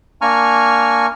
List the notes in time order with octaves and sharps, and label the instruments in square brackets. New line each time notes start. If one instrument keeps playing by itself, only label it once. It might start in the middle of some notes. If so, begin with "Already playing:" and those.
[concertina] A#3 D4 G#5 A#5 C#6 F6